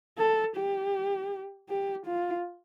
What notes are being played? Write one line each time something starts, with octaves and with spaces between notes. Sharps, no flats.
A4
G4
G4
F4